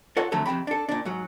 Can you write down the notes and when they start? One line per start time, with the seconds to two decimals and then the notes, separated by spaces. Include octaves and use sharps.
0.17 F4 A4 C#5 D5 F#5
0.32 F2 D3 F#3 A3 A4
0.46 F2 C3 D#4 G5 B5
0.67 D4 A4
0.89 A#2 D4
1.05 G#2 F#3